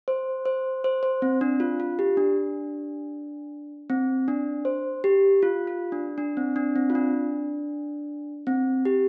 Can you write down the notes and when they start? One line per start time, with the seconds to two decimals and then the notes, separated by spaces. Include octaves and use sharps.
0.08 C5
0.45 C5
0.84 C5
1.03 C5
1.22 C4
1.41 D4
1.60 F4
1.80 F4
1.99 G4
2.17 D4
3.90 C4
4.28 D4
4.65 C5
5.04 G4
5.43 F4
5.67 F4
5.92 D4
6.18 D4
6.37 C4
6.56 D4
6.76 C4
6.90 F4
6.95 D4
8.47 C4
8.85 G4